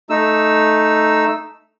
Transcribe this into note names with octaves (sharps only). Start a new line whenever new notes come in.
A3 D#4 E6